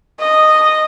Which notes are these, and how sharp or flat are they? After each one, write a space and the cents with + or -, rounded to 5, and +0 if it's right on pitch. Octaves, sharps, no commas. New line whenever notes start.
D#5 -10